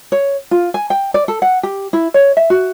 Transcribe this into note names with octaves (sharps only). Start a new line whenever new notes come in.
C#5
F4
G#5
G5
D5
A4
F#5
G4
E4
C#5
E5
F#4